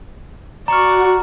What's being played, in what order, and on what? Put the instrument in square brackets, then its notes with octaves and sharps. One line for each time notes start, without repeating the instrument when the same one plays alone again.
[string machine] F#4 [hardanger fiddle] D5 C#6 [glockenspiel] A#5 F6